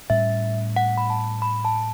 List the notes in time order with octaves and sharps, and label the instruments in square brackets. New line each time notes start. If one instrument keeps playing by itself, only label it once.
[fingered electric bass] A2 G3 C#4 [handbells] E5
[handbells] F#5
B5
A5
B5
A5